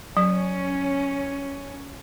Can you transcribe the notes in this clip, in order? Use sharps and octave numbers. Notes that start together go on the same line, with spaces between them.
F#3 C#4